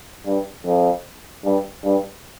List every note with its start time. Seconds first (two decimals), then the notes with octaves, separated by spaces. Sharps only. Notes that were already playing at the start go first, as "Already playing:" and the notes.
0.26 G2
0.65 F2
1.44 G2
1.84 G2